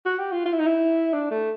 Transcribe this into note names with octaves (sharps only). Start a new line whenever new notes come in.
F#4
G4
F4
F4
E4
D#4
E4
D4
A3